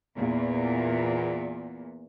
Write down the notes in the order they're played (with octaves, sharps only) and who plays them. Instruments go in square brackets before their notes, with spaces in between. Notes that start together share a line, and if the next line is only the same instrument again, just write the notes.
[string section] E2 A#2